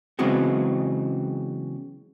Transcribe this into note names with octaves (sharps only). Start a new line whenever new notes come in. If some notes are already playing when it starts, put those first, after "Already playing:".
C#3 E3 F#3 G#3 B3 C4